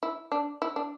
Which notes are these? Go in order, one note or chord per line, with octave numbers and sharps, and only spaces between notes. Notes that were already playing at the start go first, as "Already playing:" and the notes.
E4
D4
E4
D4